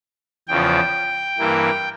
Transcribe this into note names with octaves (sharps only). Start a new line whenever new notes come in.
E2 C#3 F3 G5
G2 E3 A#3